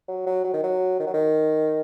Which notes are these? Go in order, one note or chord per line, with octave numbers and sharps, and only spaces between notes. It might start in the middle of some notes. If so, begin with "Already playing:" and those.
F#3
F#3
F#3
D#3
F#3
D#3
F#3
D#3